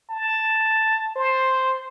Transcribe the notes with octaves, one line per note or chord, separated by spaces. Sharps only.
A5
C5